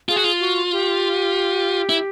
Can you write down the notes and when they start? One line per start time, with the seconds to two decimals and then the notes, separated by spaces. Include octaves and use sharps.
0.09 F4 G#4
0.16 F#4
0.24 F4
0.40 F#4
0.72 G4
1.89 E4